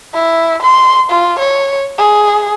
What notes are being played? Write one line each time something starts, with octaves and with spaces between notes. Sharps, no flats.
E4
C6
F4
C#5
G#4